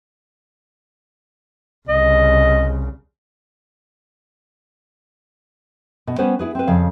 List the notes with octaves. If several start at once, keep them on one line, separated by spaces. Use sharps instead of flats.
C2 C#3 D#5
B2
G3 B3 C#4 B4 C5
E4 G#4 B4
C4 B4
F2 C#3 F5